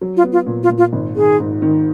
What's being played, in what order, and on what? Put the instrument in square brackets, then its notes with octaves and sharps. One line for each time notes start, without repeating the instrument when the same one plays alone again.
[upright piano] F#3
[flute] F4
[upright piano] B3
[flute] F4
[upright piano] A#2
[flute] F4
[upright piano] A#2
[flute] F4
[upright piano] G#1
[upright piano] D#3 [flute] G#4
[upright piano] G#2
D#3